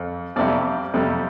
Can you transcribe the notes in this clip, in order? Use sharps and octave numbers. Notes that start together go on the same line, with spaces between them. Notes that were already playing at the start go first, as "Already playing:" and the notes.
Already playing: F2
F2 C3 G3 D5
F2 C3 G3